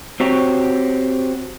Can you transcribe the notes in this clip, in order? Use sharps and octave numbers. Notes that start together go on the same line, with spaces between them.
C4 F#4 G4 C#5